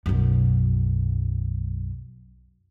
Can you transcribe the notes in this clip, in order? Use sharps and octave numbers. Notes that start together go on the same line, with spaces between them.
B1 F#2